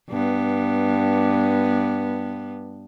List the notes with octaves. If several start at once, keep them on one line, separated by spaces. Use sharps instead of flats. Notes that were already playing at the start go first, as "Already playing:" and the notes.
G2 B3